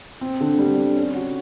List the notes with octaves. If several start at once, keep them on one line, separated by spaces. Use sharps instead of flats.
C4
D3
G3
D3
C#4
F#4